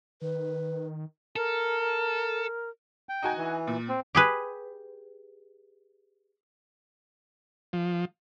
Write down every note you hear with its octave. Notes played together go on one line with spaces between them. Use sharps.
D#3 B4
A4 A#4
G5
D#4 F#4 G#5
E3
A#2
C4
G4 G#4 B4
F3